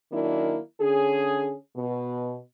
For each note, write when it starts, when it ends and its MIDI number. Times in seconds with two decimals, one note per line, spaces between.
0.12 0.59 51
0.12 0.59 54
0.12 0.59 58
0.12 0.59 62
0.12 0.59 64
0.81 1.55 50
0.81 1.55 61
0.81 1.55 68
1.76 2.37 47